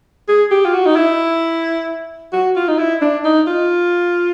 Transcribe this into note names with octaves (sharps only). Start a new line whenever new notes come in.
G#4
G4
F4
F#4
D#4
E4
F#4
F4
D#4
E4
D4
D#4
F4